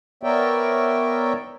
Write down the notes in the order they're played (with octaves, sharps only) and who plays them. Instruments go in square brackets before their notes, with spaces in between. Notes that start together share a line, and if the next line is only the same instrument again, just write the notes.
[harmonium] B3 A#4 C#5 D5 E5 G5